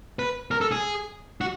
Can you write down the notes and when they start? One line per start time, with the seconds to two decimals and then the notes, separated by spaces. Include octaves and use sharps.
0.19 B4
0.51 A#4
0.61 A4
0.72 G#4
1.41 F#4